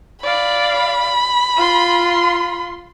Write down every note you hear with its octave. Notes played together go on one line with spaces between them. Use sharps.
D5 F5 B5
F4 C6